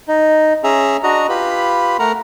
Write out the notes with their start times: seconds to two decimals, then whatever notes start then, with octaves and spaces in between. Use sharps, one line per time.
0.08 D#4
0.64 C#4 G#4 E5 A#5
1.03 D4 F#4 D#5 A#5
1.29 F4 G4 B4 B5
1.99 A3 A#4 F#5 A#5